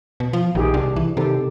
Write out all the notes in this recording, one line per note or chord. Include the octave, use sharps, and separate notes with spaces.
B2
F3
A#1 D#3 G4 G#4
C2 D4
E3
C3 D#3 G4 A4